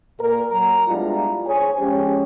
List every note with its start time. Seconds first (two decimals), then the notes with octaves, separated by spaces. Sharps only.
0.21 A#2 A#4
0.52 F#3 A#5
0.87 G3 G#3 B3 D4 E4 F4
1.47 G#4 C5 C#5 G#5
1.80 F3 G#3 C#4 G4